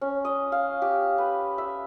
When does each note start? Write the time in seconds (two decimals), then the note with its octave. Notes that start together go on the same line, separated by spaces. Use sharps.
0.01 C#4
0.25 D#5
0.52 F5
0.82 G4
1.18 B4
1.58 E5